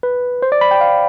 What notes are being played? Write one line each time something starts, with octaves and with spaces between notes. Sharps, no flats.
B4
C5
D5
B5
G5
F5